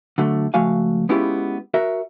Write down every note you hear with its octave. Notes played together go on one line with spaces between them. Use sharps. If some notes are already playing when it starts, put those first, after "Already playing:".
D3 F#3 A3
C#2 F3 A3 F#4 F5 G#5
G#3 B3 C#4 E4 F4 G4
F#4 A#4 E5